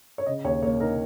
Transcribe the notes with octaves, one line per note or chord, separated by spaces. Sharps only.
C#5
C#3 D#5
D#2 C#5
A#3 C#5
D#4 A#4